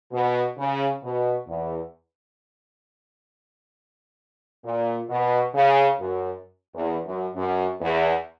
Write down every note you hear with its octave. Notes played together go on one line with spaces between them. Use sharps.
B2
C#3
B2
E2
A#2
B2
C#3
F#2
E2
F#2
F#2
E2